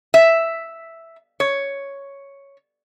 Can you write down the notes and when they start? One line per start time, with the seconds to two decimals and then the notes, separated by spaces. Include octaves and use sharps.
0.14 E5
1.40 C#5